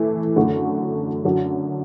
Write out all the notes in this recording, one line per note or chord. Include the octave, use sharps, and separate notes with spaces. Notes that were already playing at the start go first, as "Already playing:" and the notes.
Already playing: E3 A3 E4
F#2 D3 A3 F#4
F#2 D3 F#3